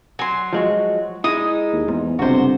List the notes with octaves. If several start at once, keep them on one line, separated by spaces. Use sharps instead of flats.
F#3 G#5 C6
F3 G#3 F#4
G#3 D#4 E4 D#6
D#2
E2 G#2
G1 C#2 C3 F#4 C5